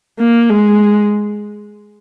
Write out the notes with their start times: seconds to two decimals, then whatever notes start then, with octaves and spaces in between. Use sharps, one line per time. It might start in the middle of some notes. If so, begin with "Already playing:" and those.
0.19 A#3
0.49 G#3